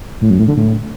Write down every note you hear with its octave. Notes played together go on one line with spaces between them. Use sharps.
A2
F#2
A2
D3
A2